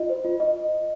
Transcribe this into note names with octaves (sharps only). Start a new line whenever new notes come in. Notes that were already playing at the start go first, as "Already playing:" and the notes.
Already playing: F4 D#5
C5
F4
D#5